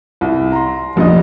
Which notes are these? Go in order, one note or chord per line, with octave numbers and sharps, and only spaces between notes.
C2
A#5 C6
F1 A#1 G3 D4 D#5 D#6